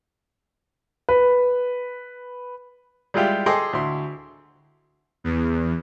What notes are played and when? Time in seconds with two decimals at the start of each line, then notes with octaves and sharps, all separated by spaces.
1.09 B4
3.14 G3 G#3 E4 F4 G4
3.46 G#4 A4 D#5 G5 C6 D6
3.73 D2 E4 C6
5.24 E2